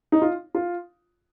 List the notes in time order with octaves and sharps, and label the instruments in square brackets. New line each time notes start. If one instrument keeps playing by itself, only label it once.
[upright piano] D#4
F4
F4